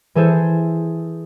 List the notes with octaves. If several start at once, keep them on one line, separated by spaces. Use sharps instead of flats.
E3 G#4 A4 C5